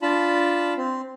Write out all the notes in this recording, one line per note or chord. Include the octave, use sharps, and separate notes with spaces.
D4 F4 A5 B5
C4